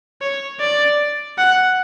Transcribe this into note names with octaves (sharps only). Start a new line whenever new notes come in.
C#5
D5
F#5